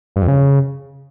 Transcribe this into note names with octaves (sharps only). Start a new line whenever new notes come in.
G2
F2
C#3